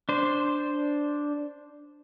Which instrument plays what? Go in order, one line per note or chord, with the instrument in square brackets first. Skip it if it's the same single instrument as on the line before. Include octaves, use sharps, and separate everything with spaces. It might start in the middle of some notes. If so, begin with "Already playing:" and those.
[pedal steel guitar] D4 C5